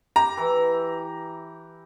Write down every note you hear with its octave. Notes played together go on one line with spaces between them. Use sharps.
G4 A#5
E3